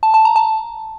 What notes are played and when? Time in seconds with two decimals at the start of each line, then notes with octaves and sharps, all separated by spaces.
0.03 A5
0.14 A5
0.25 A#5
0.36 A5